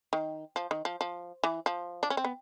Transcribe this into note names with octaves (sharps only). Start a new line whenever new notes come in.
D#3
F3
D#3
F3
F3
E3
F3
D4
C#4
C4
B3